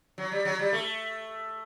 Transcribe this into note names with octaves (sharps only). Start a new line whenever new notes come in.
F#3
G3
F#3
G3
A3